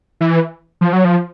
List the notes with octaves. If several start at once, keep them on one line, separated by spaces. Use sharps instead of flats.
E3
F3
F#3
F3